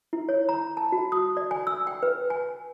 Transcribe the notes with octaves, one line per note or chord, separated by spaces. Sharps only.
E4
C#5
A#5
A5
F#4
D#6
D5
G#5
E6
G5
B4
G#5